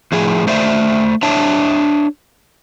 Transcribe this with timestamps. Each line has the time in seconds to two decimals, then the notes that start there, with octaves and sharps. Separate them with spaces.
0.12 A2 F3 G#4
0.47 A3 C5 D5 E5
1.23 D4 C#5 E5 A5